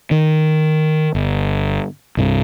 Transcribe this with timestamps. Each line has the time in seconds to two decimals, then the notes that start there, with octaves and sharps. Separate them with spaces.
0.11 D#3
1.15 G1
2.17 C2 G2 C3